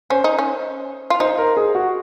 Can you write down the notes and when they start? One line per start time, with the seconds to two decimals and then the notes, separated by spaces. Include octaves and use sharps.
0.10 C#4 C5
0.24 D#4
0.39 C#4
1.10 F4
1.20 D#4 C5
1.38 A#4
1.57 G#4
1.75 F#4